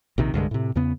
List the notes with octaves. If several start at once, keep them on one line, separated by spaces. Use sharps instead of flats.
A#1 C3 D#3
C2 G2 D3 G#3
A2 C3
E2 C#3 B3